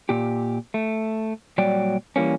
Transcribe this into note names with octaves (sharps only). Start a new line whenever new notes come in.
A#2 G4
A3
A#2 F#3 G3 D5 G5
E3 G3 A#3 C#4